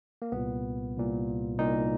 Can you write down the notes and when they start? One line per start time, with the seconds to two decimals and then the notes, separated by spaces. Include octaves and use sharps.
0.22 A#3
0.32 C2 A#2 B3
0.96 C2 A#2
1.59 C2 A#2 D#4